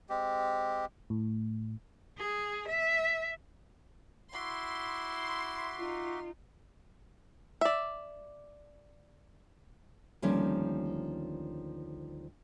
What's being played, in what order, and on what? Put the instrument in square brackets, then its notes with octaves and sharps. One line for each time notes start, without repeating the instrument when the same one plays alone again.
[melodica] G#3 C4 G4
[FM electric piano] A2
[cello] G#4
E5
[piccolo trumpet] E4 [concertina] F#4 E5 D6 [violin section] C6
[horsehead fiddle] D#4 F4
[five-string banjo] D5 E5
[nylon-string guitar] D2 D#3 F3 G3 A#3 C#4